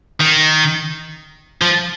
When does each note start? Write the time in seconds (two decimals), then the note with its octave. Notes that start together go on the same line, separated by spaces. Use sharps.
0.21 D#3
1.62 F3